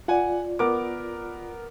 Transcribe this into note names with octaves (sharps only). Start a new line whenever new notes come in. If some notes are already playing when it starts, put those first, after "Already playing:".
F4 D5 F#5 G#5
B3 A#4 D6